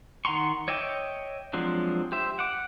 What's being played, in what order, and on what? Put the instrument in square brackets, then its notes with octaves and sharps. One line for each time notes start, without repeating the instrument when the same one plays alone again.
[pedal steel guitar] D#3 F#5 A#5 C6 C#6
C#5 D#5 E5 G5 D6
F3 F#3 G#3 C4 D4
G4 C5 E5
F#5 D6